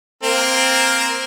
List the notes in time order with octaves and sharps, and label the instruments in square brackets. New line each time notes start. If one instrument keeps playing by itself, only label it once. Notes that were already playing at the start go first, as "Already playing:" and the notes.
[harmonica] A#3 C4 A#4